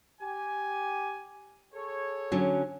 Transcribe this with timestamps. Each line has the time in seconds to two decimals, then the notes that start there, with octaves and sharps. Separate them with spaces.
0.21 G4 G#5
1.74 G#4 A4 C#5
2.32 D3 F#3 C#4